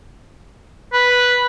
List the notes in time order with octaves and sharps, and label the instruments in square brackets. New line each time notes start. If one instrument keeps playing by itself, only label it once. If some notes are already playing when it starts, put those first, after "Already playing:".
[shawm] B4